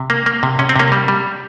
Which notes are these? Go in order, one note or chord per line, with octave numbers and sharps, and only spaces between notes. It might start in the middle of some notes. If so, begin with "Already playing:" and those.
Already playing: C3
A#3
A#3
C3
C3 C#4
C4
C3 A#3 C#4
G3
G3